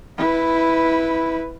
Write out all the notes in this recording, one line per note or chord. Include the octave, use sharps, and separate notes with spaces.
E4 B4